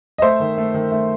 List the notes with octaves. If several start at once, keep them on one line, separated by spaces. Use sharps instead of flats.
D#5
A3 C5 E5
D#3
A3
D#3
A3